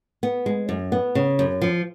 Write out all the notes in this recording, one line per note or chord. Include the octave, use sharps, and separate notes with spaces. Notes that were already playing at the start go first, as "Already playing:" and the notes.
B3
G#3
F#2
B3
C#3
F#2
F3